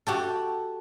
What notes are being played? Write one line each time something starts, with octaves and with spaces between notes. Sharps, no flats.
F#4 G4 A4